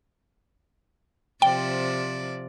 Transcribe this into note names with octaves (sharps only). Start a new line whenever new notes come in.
C3 F3 D5 G5